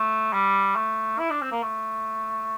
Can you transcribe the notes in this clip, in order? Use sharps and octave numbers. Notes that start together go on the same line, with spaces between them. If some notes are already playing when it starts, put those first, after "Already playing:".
Already playing: A3
G3
A3
E4
D4
C4
A#3
A3